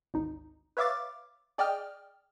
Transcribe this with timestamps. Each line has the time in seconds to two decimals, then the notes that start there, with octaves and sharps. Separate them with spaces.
0.14 G#1 D2 D#4
0.77 B4 C#5 E5 F5 D6 A6
1.58 G#4 D5 D#5 G5 F6